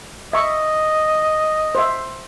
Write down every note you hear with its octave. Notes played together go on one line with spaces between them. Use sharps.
D#5 E5 C#6
C5 E5